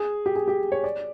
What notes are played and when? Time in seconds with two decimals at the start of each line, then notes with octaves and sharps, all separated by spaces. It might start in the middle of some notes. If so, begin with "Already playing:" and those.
Already playing: G#4
0.26 G4
0.36 G#4
0.48 G4
0.72 C#5
0.84 D5